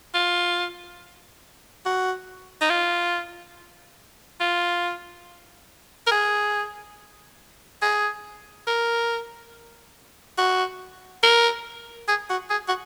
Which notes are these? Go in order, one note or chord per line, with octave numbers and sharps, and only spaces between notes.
F4
F#4
D#4
F4
F4
A#4
G#4
G#4
A#4
F#4
A#4
G#4
F#4
G#4
F#4